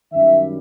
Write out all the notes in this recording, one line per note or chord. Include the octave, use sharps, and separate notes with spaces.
F#2 D#3 G3 E5